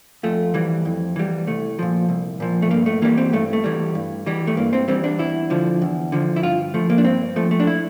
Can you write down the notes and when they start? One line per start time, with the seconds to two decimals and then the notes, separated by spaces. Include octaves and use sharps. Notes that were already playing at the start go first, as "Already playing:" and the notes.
0.23 F2 A3
0.54 E3 G3
0.85 F2
1.16 E3 G3
1.47 C2 A3
1.79 A#2 F3
2.09 C2
2.40 A#2 F3
2.62 A3
2.71 G2 A#3
2.86 A3
3.02 E3 G3 A#3
3.18 C4
3.33 G2 A3
3.53 A3
3.64 E3 G3
3.95 G2
4.26 E3 G3
4.47 A3
4.57 G2 A#3
4.73 C4
4.88 E3 G3 C4
5.04 D4
5.19 E2 E4
5.50 D3 F3
5.82 E2
6.12 D3 F3
6.36 E4
6.43 G2 F4
6.74 F3 A3
6.90 A#3
6.98 D4
7.04 G2 C4
7.36 F3 A3
7.51 A3
7.60 D4
7.67 E4